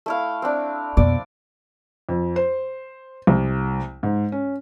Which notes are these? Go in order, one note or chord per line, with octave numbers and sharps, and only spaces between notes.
A3 E4 F5
C4 D4
F2 B2 D5
F2
C5
C2
G#2
C#4